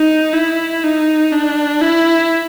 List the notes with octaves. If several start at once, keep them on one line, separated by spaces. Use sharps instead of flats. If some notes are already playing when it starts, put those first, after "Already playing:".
Already playing: D#4
E4
D#4
D4
E4